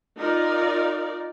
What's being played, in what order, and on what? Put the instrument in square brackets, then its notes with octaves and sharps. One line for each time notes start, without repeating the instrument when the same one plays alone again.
[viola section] D#4 F4 A#4 D5